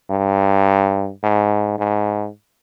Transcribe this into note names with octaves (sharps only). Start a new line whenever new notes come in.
G2
G#2
G#2